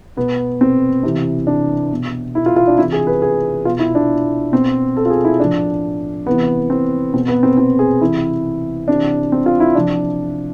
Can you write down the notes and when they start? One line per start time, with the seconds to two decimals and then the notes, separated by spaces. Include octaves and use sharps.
0.17 B2 B3
0.61 C4
1.03 C3 E3
1.47 D4
1.91 B2
2.35 E4
2.46 F4
2.56 F4
2.67 D4
2.78 C3 E4
2.80 E3
2.92 G#4
3.07 B4
3.22 G#4
3.65 B2 F4
3.79 E4
3.95 D4
4.52 B2 C4
4.97 A4
5.05 F4
5.10 G#4
5.24 E4
5.40 A2 F3 D4
6.26 C3 E3 B3
6.70 C4
7.14 B2 C4
7.28 B3
7.43 C4
7.58 C4
7.79 G#4
8.01 C3 E3 E4
8.88 C3 E3 D4
9.32 C4
9.46 F4
9.60 E4
9.75 C3 F3 D4